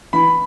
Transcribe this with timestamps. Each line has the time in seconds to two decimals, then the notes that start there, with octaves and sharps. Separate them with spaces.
0.13 E3 B5